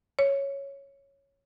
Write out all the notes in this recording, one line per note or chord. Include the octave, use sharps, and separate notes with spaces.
C#5